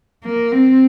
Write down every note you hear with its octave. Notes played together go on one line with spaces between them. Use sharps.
A#3
C4